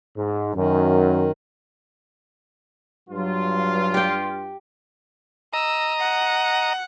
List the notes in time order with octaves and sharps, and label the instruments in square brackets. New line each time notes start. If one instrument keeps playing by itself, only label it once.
[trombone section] G#2
[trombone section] F#2 [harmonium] D#3
[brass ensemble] G2 F4 [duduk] F#3
[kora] G4 G5
[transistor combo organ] D#5 A#5 [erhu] E6
[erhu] F#5